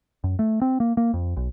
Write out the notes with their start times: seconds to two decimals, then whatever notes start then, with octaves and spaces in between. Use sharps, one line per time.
0.24 F#2
0.39 A3
0.62 C4
0.80 A#3
0.97 A#3
1.13 F2
1.37 B1